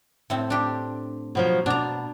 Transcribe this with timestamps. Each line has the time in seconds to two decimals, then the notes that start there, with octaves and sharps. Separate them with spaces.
0.30 A2 C4
0.50 D4 G4
1.35 B2 F3 F#3
1.66 B2 D4 A#5